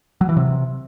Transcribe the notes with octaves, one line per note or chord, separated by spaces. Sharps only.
F#3
E3
C3